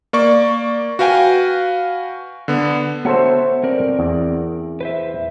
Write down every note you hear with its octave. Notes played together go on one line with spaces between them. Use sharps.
A#3 D5 C#6
F#4 B4 F5 G5 G#5
D3 B3
B3 F#4 A4 C5 C#5 E5
C4 A#4 D5
E2
B4 C5 E5